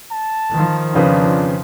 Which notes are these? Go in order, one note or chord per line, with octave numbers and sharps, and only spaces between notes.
A5
D#3 F3
F2 C#3 D4 B4